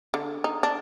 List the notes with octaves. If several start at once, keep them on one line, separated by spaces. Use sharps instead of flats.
D3
D#4
D4